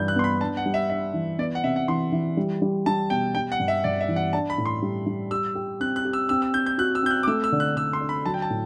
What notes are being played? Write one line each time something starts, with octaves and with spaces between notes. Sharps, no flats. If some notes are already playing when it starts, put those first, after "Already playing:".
Already playing: G2 E3 G6
F#6
B3 C6
B5
D4 A5
F#5
G3
E5
D4 E5
E3
B3 D5
F#5
C3 E5
F#5
E3 C6
E3
G3
G3
G3 A5
B2 G5
G3 G5
F#5
G2
E5
G2 D5
E5
E3
F#5
D4 A5
B5
A2
C6
G3
G3
G4 E6
G4
C4 F#6
F#6
G4
E6
C4 E6
E6
C4 G6
G6
F#4 F#6
E6
C4 G6
F#6
D6
A3 E6
E6
D3
F#6
D3 E6
C6
D4
B5
F#3 A5
G5
A5
A2